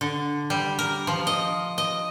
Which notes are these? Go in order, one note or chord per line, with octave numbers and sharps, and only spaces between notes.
D3
G3
A#4
F3
D#5
D#5